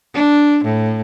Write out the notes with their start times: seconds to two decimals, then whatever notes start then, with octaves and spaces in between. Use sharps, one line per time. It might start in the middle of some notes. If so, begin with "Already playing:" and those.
0.14 D4
0.64 A2